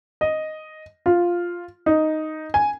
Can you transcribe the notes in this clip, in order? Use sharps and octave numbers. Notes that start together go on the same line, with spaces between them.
D#5
F4
D#4
G#5